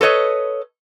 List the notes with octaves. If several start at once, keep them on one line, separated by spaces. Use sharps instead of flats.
A4 B4 C#5 D#5